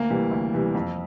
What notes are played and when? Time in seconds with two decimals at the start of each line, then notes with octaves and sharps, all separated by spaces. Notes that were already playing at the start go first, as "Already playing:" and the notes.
Already playing: D2 A#3
0.10 C3 E3 G3
0.31 D2
0.54 C3 E3 G3
0.75 F2